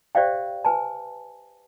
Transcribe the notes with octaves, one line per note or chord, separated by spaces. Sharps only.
G4 C5 D5 E5 F5 G5
B4 G#5 A5